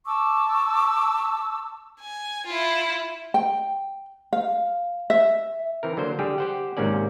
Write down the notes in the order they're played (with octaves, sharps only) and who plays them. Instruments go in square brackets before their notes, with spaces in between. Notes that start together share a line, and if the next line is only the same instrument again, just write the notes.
[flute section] A5 C#6 D6 E6
[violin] G#5
E4 F4
[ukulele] G5
F5
E5
[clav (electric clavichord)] E3 C4 A#4
D3 F#3 A#3 C5
D3 G3 G4 G#4
G4 C5 F#5
G#1 G#2 C3 A#3 C#4 D5